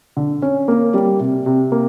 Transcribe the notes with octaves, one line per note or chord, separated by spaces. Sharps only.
D3
C#4
A#3
G3
C3
C3
A#3